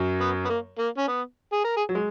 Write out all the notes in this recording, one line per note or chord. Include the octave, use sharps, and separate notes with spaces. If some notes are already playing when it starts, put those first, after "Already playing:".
Already playing: F#2 F#3
B3
B3
A#3
A#3
C#4
B3
G#4
A#4
G#4
F#3
G#3